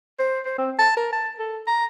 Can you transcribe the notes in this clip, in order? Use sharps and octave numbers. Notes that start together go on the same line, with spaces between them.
C5
C5
C4
A5
A#4
A5
A4
A#5